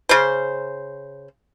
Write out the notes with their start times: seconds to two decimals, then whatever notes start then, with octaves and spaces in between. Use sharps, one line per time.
0.09 C#3 C5